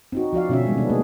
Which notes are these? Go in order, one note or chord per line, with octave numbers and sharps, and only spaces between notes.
C4 D#4 F#4
F3 F#4 D5 F5
B2 D3 C#4 F#4 E5
C3 D#3 G3 G#3 B3 D4
D#3 B3 D4
A3 A#3 G#4